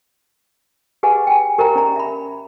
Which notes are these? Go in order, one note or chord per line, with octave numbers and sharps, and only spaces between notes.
G4 G#4 B4 D#5 F#5 G#5
G5 G#5
G4 A#4 C5 D#5 G5 A#5
C#4 D5 A#5
E5 B5